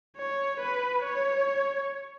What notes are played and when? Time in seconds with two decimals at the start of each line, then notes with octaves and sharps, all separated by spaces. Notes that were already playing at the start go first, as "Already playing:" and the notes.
0.17 C#5
0.60 B4
1.04 C#5